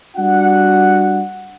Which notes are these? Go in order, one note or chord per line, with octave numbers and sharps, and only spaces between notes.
G3 D4 F#4 F#5